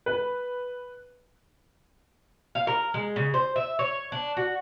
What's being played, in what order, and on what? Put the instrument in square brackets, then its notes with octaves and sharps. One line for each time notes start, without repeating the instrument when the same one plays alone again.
[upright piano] B4
[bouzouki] F5
A#4
G#3
C#3
C5
E5
C#5
D4
F#4